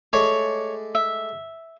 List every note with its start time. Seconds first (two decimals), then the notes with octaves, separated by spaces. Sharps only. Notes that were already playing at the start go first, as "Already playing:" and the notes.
0.13 G#3 A3 C#5 D5
0.95 E5